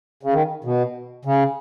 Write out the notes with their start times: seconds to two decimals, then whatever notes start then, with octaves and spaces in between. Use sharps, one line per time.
0.23 C#3
0.33 D#3
0.64 B2
1.25 C#3